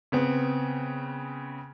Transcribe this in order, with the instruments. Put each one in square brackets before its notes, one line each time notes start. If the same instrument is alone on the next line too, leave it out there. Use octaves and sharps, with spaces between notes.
[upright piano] C#3 B3 C4